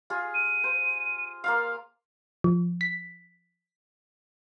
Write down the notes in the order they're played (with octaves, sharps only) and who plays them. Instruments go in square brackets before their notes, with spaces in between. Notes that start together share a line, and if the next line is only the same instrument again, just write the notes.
[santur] F4 G#4
[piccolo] D#7
[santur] C5
A#3 F4 F5
[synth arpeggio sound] F3
B6